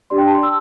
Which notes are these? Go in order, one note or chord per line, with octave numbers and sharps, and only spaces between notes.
D4 G4 D5 C6
G5
A5
C6
E6